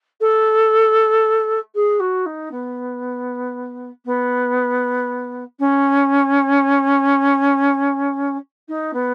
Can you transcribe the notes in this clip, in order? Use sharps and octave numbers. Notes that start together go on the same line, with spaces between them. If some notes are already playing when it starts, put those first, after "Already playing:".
A4
G#4
F#4
D#4
B3
B3
C#4
D#4
B3